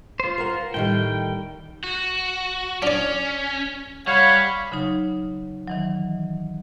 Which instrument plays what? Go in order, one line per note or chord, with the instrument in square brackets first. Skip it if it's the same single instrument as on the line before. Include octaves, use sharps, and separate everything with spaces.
[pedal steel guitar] F4 C5
[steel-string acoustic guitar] A#4 F#5
[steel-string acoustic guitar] A2 D#3 G3 [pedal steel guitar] G5
[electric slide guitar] F#4
[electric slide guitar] C#4 [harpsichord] D4 D5
[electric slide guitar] G3 [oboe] C#5 [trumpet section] F5 F#5 B5
[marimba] C#3 F#3 D#4
D#3 E3 F#3